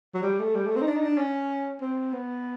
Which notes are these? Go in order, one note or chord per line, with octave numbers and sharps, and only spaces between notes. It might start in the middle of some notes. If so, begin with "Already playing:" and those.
F#3
G3
A3
G3
A3
C4
D#4
D4
D#4
D4
C#4
C4
B3